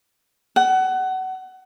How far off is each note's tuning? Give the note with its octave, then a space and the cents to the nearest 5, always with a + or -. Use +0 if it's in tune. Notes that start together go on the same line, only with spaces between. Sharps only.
F#5 +25